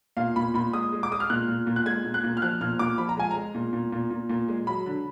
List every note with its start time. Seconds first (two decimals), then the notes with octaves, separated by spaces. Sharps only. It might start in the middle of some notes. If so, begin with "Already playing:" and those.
0.17 A#2 F5
0.36 A#2 B5
0.54 A#2 B5
0.73 G#3 D#6
0.93 G#3
1.03 D6
1.12 G#3 D#6
1.20 F6
1.30 A#2 F#6
1.48 A#2
1.67 A#2
1.76 F#6
1.85 G#3 G#6
2.05 A#2
2.14 F#6
2.24 A#2
2.37 F6
2.42 F3 F#6
2.61 A#2 F6
2.79 A#2 D6
2.98 F3 B5
3.09 A#5
3.17 G#3 G#5
3.31 G#3 A#5
3.55 A#2
3.73 A#2
3.92 A#2
4.11 A#2
4.29 A#2
4.48 G#3
4.67 F#3 B5
4.86 D3